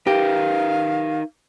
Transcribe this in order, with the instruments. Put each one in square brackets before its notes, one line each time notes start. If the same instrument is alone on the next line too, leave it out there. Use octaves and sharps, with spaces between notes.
[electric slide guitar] D#4 A#4 B4 [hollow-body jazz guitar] G4 [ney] F5